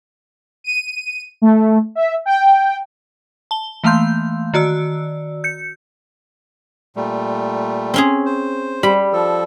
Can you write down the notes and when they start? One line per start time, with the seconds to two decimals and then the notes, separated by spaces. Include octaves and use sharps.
0.64 D#7
1.42 A3
1.95 E5
2.26 G5
3.51 A5 G7
3.84 E3 A3 A#3 F5 C6 G6
4.54 D#3 F#4 D5 E6
5.44 G6 C#7
6.96 A#2 G3 A3
7.94 C4 C#4 G#4
8.26 C5
8.83 G3 B5
9.13 F3 A4